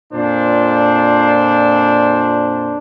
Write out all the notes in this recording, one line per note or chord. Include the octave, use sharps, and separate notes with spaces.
F2 A#2 D4 C5